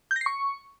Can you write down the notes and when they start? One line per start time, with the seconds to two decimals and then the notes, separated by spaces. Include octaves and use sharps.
0.11 G6
0.16 A#6
0.21 C7
0.26 C#6